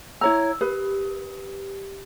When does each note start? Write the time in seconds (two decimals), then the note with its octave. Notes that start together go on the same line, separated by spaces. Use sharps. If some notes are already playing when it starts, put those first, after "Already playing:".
0.21 E4 C#5 A#5 E6
0.61 G4 B4